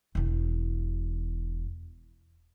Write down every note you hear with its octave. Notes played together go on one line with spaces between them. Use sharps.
E1 E2